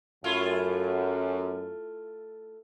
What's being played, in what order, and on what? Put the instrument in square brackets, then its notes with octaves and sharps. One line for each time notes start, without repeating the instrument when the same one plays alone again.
[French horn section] F#2 [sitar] A3 E4 F4